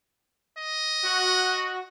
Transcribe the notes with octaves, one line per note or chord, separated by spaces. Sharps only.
D#5
F#4